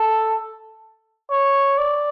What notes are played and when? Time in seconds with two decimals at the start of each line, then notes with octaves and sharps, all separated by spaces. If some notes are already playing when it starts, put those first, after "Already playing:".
Already playing: A4
1.30 C#5
1.78 D5